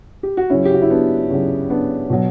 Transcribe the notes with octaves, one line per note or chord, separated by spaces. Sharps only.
G4
F#4
C#3 F#3 C#4 E4
G4
F#4
E4
B3 D4
C#3 F#3 C#4
B3 D4
B2 F#3